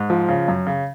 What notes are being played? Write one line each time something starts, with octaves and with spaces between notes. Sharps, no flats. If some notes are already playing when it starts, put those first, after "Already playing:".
Already playing: G#2
F3
C#3
F#2
C#3